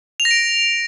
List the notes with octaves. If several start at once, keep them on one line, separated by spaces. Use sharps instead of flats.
F7
A#6
D7